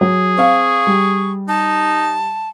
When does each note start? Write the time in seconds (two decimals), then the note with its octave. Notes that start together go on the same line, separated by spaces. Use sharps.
0.01 F#3 G#4
0.37 C4 F5 C#6
0.87 G3
1.48 D#4 A5